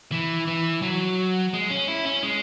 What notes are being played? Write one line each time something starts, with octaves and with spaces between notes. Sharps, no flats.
E3
E3
F#3
G#3
C#4
E4
C#4
G#3